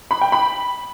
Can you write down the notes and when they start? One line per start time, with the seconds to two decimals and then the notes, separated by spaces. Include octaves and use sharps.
0.11 B5
0.21 G5
0.32 B5